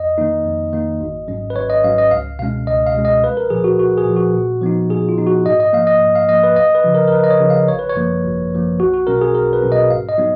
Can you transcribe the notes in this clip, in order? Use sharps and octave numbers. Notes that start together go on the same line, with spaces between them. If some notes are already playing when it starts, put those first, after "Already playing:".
Already playing: F2 D#5
D#3 A#3 D#4
F2
D#3 A#3 D#4
G#1
G#2 F#3 C#4
B4
G#1 C#5
D#5
G#2 F#3 C#4 F5
D#5
C#2 F5
B2 G#3 C#4 F5
C#2 D#5
F5
B2 G#3 C#4
D#5
A#1 B4
A#4
A#2 F3 G#4
F#4
A#1 F#4
G#4
A#2 F3
F#4
A#2
F3 B3 D#4
A#2 G#4
F4
F3 B3 D#4
F#4
G#2 D#5
D#5
F3 A#3 F5
D#5
G#2
F5
F3 A#3 D#5
B4
D#2 D#5
B4
C#3 F3
A#4
A#4
D#2 B4
D#5
C#5
C#3 F3
F5
G#1 C#5
B4
C#5
F#2 F3 A#3
G#1
F#2 F3 A#3
B1 F#4
F#4
B2 F#3 C#4 A#4
G#4
B1 A#4
B4
B2 F#3 C#4
D#5
G#2 F5
D#5
F#3 B3 D#4